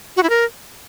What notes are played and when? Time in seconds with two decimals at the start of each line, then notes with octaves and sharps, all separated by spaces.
0.16 F#4
0.23 E4
0.30 A#4